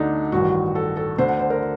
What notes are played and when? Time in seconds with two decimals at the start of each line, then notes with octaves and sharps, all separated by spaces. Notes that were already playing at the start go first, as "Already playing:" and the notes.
Already playing: D2 D3 D4 D#4
0.32 A1 G2 D#3 F#4
0.75 A4
0.97 A4
1.18 D2 D3 C5
1.28 F#5
1.39 C5
1.50 A#4